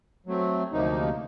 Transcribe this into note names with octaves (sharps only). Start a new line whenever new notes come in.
F#3 A3 C4
D2 C3 F3 A#3 D#4